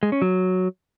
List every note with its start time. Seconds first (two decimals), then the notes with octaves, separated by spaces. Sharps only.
0.03 G#3
0.12 C#4
0.22 F#3